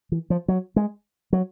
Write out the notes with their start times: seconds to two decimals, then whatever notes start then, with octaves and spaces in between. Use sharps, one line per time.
0.12 E3
0.30 F3
0.48 F#3
0.76 G#3
1.33 F#3